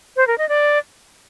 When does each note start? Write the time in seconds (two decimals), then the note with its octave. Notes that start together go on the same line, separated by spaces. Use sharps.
0.16 C5
0.27 A#4
0.38 D#5
0.49 D5